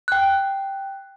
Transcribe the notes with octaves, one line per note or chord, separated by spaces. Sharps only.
G5 F#6